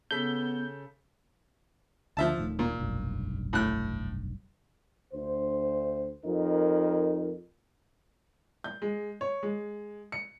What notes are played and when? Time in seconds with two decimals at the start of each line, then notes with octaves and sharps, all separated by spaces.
0.11 C#3 B3 A4 G6 B6
2.17 D2 D3 F3 E5 A5
2.38 D1 A2 D#3
2.59 A#2
2.79 F1 B1 G2
3.53 A2 F#6
5.14 D2 C5
6.25 F2 D#4 A#4
8.64 G6
8.82 G#3
9.21 C#5
9.43 G#3
10.12 C#7